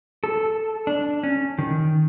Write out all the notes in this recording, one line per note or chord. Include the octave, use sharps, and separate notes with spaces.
A4
D4
C#4
D#3